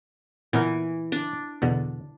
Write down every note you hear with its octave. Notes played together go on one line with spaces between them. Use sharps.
A#2 E3 B3 A#4
D4
E2 B2 D3